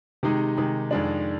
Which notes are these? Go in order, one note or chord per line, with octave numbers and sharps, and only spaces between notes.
C3 D#3 G#3 D#4 G4
C3 D#3 G#3 D#4 G4
F2 D#3 G#3 D4